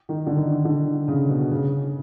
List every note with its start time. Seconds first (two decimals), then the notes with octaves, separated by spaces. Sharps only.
0.09 D#3
0.26 D3
0.37 D#3
0.65 D3
1.08 C#3
1.29 B2
1.51 C#3